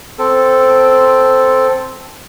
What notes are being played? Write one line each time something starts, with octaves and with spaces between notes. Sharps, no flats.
C4 A4